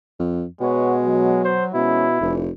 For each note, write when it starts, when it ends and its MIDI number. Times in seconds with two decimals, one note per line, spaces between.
0.19 0.46 41
0.60 1.61 47
0.60 1.40 56
0.60 0.94 71
0.60 0.94 73
0.60 0.94 78
1.04 1.74 54
1.45 1.65 72
1.74 2.17 47
1.74 2.06 53
1.74 2.06 56
1.74 2.06 61
1.74 2.33 64
2.20 2.50 29
2.20 2.41 50
2.20 2.41 52